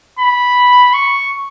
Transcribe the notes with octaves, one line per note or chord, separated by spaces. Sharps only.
B5
C#6